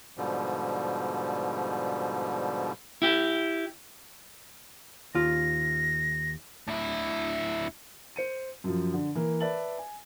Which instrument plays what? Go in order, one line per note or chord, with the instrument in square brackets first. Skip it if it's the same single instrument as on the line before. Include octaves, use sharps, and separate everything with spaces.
[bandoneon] G#2 B2 D3 F3 G3
[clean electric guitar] E4 G4
[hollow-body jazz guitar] D#2 F4 [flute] A#6
[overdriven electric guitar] D2 E4
[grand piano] C5 C#7 D#7
F#2 F3
D3
E3 A#3
B4 D5 E5 A5 A6 F#7
G#5